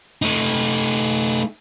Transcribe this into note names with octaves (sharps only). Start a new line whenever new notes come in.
A3 D#4